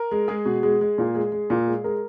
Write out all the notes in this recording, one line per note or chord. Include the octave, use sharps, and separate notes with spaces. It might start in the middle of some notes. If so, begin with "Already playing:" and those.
Already playing: A#4
G#3
G#3 G#4
B2
G#3
G#3
A#2
G#3
G#3
A#2
G#3
G#3 A#4